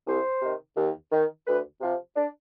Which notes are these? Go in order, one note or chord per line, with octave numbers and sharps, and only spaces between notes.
C2 C5
C3 D#3
D#2
D#3
D2 B4
C3 F3
D4